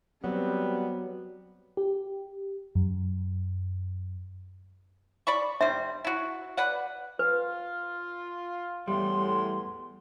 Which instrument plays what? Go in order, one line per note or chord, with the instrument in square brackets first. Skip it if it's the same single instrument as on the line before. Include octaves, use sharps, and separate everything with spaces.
[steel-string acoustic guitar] F#3 [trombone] G3 [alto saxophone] B3 [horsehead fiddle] C4
[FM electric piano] G4
F#2
[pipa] D5 B5 C#6
[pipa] G3 C5 [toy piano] E5
[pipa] E4 F#4
B4 D5 F#5
[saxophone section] F4 [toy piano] B4
[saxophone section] E2 A2 [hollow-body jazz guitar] G3 [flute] C6